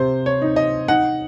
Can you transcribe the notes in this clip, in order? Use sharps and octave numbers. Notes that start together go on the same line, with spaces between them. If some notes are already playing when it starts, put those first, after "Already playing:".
Already playing: C3 C4 C5
C#5
D#4
D#5
D#4 F#5